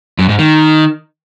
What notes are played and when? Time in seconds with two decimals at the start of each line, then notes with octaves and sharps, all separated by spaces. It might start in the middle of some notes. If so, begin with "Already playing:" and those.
0.19 F#2
0.29 G#2
0.39 D#3